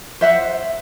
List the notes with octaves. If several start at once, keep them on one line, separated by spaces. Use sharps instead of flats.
C5 E5 F#5